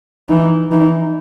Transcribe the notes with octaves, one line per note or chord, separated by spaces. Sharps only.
E3 D#4
E3 D#4